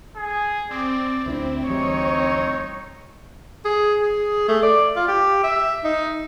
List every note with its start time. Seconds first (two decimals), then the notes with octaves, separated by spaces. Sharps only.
0.16 G#4
0.71 C4 D5
1.26 D2 A#3 D4 E4
1.67 D2 E3 G3 D#4 C#5
3.65 G#4
4.01 G#4
4.48 A3
4.63 D5
4.96 F4
5.08 G4
5.44 E5
5.84 D#4